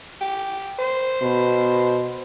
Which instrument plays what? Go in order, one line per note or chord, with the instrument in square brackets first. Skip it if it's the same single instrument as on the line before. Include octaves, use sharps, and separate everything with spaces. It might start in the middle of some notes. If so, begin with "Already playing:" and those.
[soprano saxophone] G4
C5
[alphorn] B2